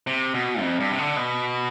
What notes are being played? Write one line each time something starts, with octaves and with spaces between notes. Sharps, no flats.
C3
B2
F2
G2
C3
D3
B2